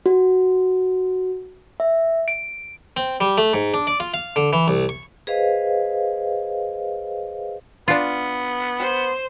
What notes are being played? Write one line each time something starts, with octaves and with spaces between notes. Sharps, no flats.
F#4
E5
D7
C4
G3
A3
G#2
D4
D5
F4
F5
D3
E3
C2
C#6
G#4 B4 C5 D#5 F5
B3 D4 F4
C5